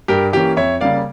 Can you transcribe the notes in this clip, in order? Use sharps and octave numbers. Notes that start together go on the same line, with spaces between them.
G2 G4 A#4
E3 A#3 C#4 G4
F2 C#5 E5
C#3 G3 A#3 D5 F5